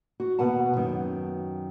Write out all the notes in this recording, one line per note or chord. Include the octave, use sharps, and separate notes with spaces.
F#4
D#2 B2 B4 F#5 A5
F#2 D#3